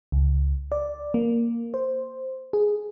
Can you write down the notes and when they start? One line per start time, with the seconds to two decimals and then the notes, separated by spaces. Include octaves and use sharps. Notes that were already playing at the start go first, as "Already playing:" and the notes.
0.12 C#2
0.72 D5
1.14 A#3
1.74 C5
2.53 G#4